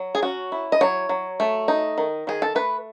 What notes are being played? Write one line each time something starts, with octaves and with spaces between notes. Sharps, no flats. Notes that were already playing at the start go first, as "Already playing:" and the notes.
Already playing: F#3
G#4
C#4 F#4
E4
D#5
F#3 C#5
F#3
A3
D#4
D#3
D#3 G#4
A4
A3 B4